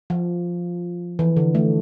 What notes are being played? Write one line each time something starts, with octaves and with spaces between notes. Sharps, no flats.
F3
E3
D3
A3